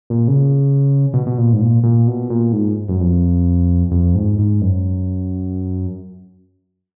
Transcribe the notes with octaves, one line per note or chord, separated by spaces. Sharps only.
A#2
C#3
B2
B2
A#2
G#2
A#2
A#2
B2
A#2
G#2
F#2
F2
F2
G#2
G#2
F#2